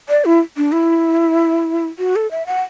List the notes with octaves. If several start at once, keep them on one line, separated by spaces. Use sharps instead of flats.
D5
E4
D4
E4
F#4
A4
E5
F#5